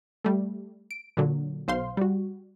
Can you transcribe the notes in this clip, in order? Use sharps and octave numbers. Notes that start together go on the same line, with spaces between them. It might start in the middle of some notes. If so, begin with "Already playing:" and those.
G3 A3
D7
A#2 D3 F#3
B1 C5 F5 C6
G3 F#4